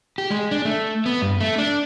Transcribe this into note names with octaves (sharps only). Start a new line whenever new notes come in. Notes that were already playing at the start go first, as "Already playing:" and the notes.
G4
G#3
D4
A3
B3
G2
A3
D4